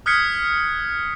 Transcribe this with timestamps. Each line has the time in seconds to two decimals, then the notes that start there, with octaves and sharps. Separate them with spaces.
0.06 D#6 F6 F#6 G#6 B6 C#7